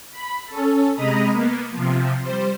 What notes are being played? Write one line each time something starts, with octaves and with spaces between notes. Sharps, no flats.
B5
C#4 A4
C3 G#3 D#5 A#5 B5 D#6
A#3 B3
C3 F3
G3 C5